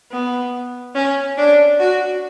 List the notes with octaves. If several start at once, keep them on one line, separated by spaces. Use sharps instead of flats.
B3
C#4
D4
F#4